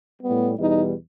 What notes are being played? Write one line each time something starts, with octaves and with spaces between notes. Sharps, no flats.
A2 G3 B3
E2 B2 G3 D#4